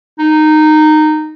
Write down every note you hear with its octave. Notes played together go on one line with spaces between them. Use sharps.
D#4